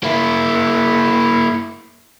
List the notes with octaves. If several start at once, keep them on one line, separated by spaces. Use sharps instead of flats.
A#3 E4